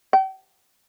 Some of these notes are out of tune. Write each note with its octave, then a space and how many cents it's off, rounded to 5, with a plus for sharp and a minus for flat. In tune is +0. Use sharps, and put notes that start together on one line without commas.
G5 -45